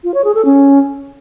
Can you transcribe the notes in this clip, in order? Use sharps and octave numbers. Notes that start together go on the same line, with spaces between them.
F4
C#5
G#4
A4
C#4